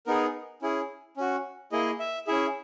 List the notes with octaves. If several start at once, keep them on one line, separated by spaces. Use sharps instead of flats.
B3 D#4 G#4 A#4
C#4 E4 G#4
C#4 F#4
A#3 E4 G#4 D#5
E5
C#4 E4 G#4 E5